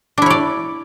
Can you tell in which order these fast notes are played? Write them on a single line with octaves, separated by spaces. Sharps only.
D4 E4 C#5 D5